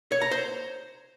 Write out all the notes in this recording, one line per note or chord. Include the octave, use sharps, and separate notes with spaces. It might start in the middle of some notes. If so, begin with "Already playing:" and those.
C#5
A#5
C5